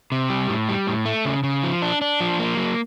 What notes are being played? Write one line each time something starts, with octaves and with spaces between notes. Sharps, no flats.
C3
G3
A2
G3
A2
A3
C#3
C#3
F3
D4
D4
F3
A#3
F#3